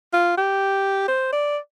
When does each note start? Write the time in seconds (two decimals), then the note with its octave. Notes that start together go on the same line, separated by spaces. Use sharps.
0.13 F4
0.37 G4
1.08 C5
1.32 D5